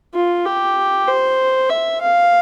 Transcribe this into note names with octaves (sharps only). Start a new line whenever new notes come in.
F4
G4
C5
E5
F5